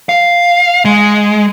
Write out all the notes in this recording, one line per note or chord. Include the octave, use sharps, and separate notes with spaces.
F5
G#3